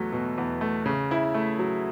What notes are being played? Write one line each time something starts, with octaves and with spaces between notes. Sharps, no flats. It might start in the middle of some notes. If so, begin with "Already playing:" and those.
Already playing: E2 F#3 A3
B2
E2
A3
C#3
E4
A3
F#3